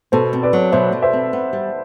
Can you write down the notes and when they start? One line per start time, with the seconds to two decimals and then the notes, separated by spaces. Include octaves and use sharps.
0.12 B2 A4 C5
0.33 C4
0.43 B4 D5
0.53 F#3
0.72 B2 C5 E5
0.92 B2
1.02 C5 E5
1.13 C4
1.33 B3
1.53 G3